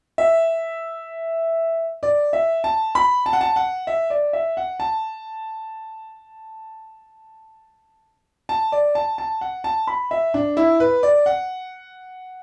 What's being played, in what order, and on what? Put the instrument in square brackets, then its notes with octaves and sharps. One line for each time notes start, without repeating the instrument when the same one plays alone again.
[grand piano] E5
D5
E5
A5
B5
A5
F#5
A5
F#5
E5
D5
E5
F#5
A5
A5
D5
A5
A5
F#5
A5
B5
E5
D4
E4
B4
D5
F#5